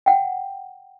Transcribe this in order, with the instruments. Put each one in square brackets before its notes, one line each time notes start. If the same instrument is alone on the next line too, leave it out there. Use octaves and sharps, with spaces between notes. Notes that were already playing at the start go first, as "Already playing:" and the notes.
[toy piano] F#5 G5